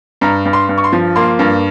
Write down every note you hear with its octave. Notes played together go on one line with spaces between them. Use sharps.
G2 A#5
G2
C6
G2
C#6
C6
F3
A#3 C6
G2